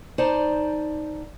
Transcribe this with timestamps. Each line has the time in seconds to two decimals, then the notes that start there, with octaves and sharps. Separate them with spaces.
0.18 D#4 C5 D5 A5 A#5